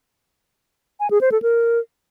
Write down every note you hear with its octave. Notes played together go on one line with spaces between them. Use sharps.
G#5
G#4
C5
A4
A#4